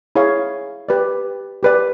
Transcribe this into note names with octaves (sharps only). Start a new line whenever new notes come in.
E4 G#4 C#5 F5
G4 B4 D5
G4 B4 D5